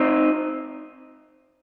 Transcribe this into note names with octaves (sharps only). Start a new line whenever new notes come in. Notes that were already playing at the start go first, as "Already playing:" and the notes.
Already playing: C4 D#4